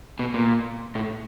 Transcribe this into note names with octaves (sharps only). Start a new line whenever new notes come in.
B2
A#2
A2